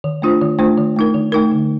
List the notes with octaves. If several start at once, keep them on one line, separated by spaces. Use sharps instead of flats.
D#3
A3 D4 F4 C5
D#3
A3 D4 F4 C5
D#3
A3 D#4 A#4
D#3
A3 D#4 A#4
D3